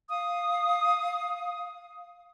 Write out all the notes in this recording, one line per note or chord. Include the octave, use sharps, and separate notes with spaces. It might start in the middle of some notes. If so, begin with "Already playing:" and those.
F5 D#6